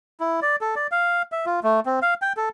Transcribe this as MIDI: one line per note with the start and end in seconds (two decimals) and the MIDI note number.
0.20 0.40 64
0.42 0.56 74
0.61 0.75 69
0.76 0.87 74
0.92 1.22 77
1.32 1.45 76
1.46 1.60 65
1.63 1.80 57
1.86 1.99 60
2.02 2.14 77
2.22 2.33 79
2.37 2.49 69